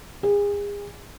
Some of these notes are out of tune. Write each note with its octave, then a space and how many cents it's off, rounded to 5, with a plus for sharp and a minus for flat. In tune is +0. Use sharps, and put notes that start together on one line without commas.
G#4 -35